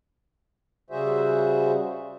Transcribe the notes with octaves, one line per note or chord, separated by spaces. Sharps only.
C#3 G3 F#4 G#4 C5 E5